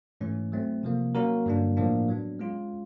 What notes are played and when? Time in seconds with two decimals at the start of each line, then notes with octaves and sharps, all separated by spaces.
0.21 G#2 E3 A3 C#4
0.52 F#3 A3 C4
0.83 C3 F3 A#3
1.15 F#3 A#3 C#4 F#4 A#4
1.46 G2 D3 F#3 A#3 D4
1.77 A2 F3 A#3 D4
2.08 F#3 B3 D4
2.39 G#3 C#4 F4